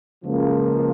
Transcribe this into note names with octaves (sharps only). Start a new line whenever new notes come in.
C#2 C#3 F3 A#3